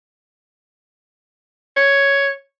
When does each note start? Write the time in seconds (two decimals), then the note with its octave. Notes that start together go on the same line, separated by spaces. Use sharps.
1.76 C#5